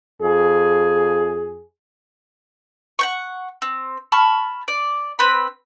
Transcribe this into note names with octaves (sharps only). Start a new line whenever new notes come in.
F2 G#4
F#5 G5 C#6
C4
A5 B5 C#6 F6
D5
C4 B4 B5